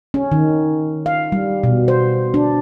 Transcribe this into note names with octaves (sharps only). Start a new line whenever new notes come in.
C#4
D#3
F5
G3
B2
C5
D4